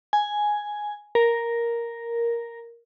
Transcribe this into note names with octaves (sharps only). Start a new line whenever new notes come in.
G#5
A#4